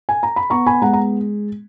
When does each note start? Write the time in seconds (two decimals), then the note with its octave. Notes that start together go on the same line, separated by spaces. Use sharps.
0.09 G#5
0.23 A#5
0.36 B5
0.50 B3 A#5 C#6
0.67 G#5 B5
0.82 G#3 F#5 A#5
0.93 A#5